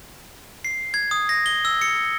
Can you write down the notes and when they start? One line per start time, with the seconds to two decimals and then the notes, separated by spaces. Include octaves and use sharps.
0.65 C7
0.94 G#6
1.11 D#6
1.29 A#6
1.46 G7
1.65 E6
1.82 C#7